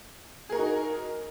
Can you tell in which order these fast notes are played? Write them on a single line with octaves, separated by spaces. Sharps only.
G#4 A#4 F#4 D#4